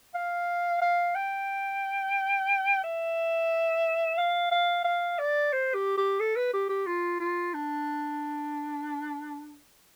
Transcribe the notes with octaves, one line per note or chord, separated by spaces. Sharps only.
F5
F5
G5
E5
F5
F5
F5
D5
C5
G4
G4
A4
B4
G4
G4
F4
F4
D4